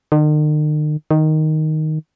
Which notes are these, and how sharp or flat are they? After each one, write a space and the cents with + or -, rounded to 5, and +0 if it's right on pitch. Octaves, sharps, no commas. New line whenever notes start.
D#3 -45
D#3 +0